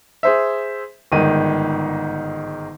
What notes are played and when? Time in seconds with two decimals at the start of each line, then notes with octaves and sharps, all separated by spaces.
0.23 G#4 C5 E5
1.12 G1 G#2 D#3 D#7